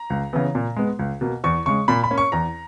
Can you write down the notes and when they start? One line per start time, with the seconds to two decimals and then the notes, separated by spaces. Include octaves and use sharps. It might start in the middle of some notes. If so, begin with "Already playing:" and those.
Already playing: A#5
0.10 C#2
0.33 C#3 E3 B3
0.55 A#2
0.76 G#3 B3
0.99 C#2
1.21 B2 A#3
1.44 E2 C#6
1.66 C#3 G#3 C#6
1.88 A#2 B5
2.04 B5
2.11 A#3 C#4
2.18 C#6
2.32 E2 A#5